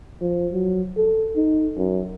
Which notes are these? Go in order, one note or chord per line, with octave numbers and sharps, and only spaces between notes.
F3
F#3
A4
D#4
F#2